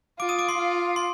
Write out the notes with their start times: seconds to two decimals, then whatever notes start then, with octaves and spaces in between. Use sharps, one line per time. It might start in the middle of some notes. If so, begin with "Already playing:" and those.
0.19 F4 D6 D7
0.29 D#6 D#7
0.39 D6 D7
0.49 C6 C7
0.57 F4
0.96 C6 C7